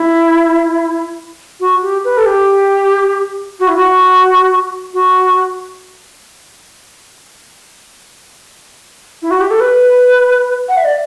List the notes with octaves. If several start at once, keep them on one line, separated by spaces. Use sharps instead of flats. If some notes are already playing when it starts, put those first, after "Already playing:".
Already playing: E4
F#4
G4
B4
A4
G4
F#4
E4
F#4
F#4
E4
F#4
G4
A4
B4
F#5
E5
D5